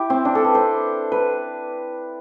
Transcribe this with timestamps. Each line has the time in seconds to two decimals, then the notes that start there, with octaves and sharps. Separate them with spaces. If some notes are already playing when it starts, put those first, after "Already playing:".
Already playing: E4 G4
0.10 C4
0.25 D4
0.35 A4
0.44 B4
0.55 C5
1.12 B4